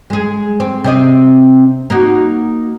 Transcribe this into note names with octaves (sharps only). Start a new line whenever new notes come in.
G#3 G#4
C4
C3 C4 D#5
A#3 D#4 F#4